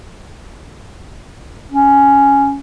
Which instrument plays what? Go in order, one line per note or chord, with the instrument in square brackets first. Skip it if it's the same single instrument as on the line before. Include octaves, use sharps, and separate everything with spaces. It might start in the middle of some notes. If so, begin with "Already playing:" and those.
[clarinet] C#4